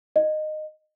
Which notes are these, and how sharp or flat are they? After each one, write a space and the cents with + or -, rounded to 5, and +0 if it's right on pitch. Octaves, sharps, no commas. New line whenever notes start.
D#5 -15